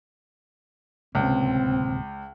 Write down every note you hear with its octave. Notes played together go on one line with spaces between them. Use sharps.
D1 C#2 C3 A#3 C4